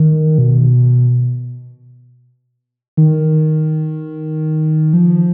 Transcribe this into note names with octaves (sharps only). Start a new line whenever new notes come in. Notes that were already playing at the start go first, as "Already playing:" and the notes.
Already playing: D#3
B2
D#3
F3